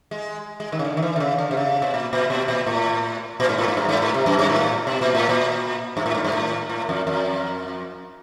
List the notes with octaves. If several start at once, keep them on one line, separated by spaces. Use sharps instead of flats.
G#3
G#3
D#3
C#3
D3
D#3
E3
D3
C#3
D3
C3
C#3
B2
A#2
A#2
B2
A#2
A2
A#2
G#2
A2
G#2
G2
G#2
A2
C3
F#2
G2
A2
B2
A#2
A2
A#2
G2
A2
G#2
G2
A2
A2
F2
F2